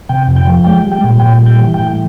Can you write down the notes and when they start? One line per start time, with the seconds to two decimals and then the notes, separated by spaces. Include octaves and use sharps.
0.09 C3 G5
0.28 F2
0.36 G5
0.47 F3
0.64 G#3 G5
0.84 G3
0.92 G5
1.04 A#2
1.19 A#2 G5
1.42 G3 G5
1.61 E3
1.74 A2 G5